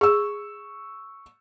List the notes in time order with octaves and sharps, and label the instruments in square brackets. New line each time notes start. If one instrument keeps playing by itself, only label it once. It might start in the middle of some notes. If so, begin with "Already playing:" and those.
[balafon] G#4 [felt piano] C#6 E6